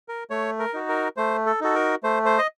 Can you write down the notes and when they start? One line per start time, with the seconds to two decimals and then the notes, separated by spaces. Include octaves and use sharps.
0.09 A#4
0.30 A3 C#5
0.59 A#4
0.74 D#4 F#4
0.89 A#4
1.17 A3 C5
1.46 A4
1.61 D#4 F#4 A4
1.75 A#4
2.03 A3 C5
2.25 C5
2.38 D#5